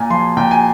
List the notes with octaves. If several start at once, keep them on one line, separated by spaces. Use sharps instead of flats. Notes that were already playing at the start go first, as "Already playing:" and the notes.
Already playing: A#2 G#5
F3 C6
A#2 G5
G#5